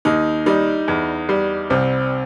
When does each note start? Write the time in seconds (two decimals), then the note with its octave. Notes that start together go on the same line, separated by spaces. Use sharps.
0.05 D#2 D#4
0.46 G3 D#4
0.88 E2
1.29 G3
1.70 C2 C4